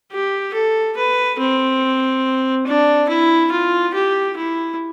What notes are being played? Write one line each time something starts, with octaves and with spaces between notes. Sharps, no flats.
G4
A4
B4
C4
D4
E4
F4
G4
E4